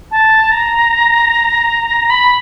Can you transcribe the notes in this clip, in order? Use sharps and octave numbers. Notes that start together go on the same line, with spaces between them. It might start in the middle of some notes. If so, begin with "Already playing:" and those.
A5
A#5
B5